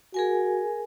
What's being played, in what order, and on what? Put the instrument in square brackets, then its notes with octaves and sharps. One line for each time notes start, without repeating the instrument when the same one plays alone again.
[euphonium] F#4 [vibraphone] G#4 A#4 G#5